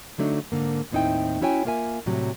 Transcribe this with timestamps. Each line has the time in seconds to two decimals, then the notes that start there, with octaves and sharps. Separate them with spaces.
0.18 D3 F#3 A3 D4 D#4
0.52 G#2 D3 A#3
0.92 D#2 A2 C4 D#4 E4 G5
1.41 C#4 E4 F#4 C#5 G5 G#5
1.65 A#3 F4 A#4 E5 G#5
2.06 A2 C3 F#3 G3